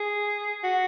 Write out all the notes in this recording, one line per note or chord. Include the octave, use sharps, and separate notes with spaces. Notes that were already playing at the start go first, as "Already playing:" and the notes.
Already playing: G#4
F#4